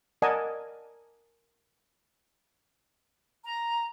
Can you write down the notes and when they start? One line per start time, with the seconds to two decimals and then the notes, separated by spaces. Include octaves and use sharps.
0.22 A#4 D5 D#5 F#5 G#5 A5
3.44 A#5